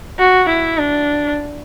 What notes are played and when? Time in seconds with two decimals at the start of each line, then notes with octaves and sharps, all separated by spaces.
0.19 F#4
0.49 E4
0.78 D4